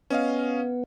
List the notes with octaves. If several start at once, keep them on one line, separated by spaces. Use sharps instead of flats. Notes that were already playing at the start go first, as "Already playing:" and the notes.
B3 C#4 D#5 F5